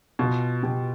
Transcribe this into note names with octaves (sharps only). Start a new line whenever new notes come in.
B2 F4
B2 G4